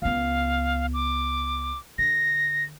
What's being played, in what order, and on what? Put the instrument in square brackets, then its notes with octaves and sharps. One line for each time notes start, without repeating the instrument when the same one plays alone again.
[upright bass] C#2 B3 [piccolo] F5
[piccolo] D6
[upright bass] D3 [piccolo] A#6